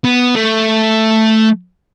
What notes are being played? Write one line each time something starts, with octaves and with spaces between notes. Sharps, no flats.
B3
A3